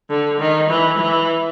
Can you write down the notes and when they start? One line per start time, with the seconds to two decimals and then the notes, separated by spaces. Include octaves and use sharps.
0.10 D3
0.40 D#3
0.70 E3
0.98 E3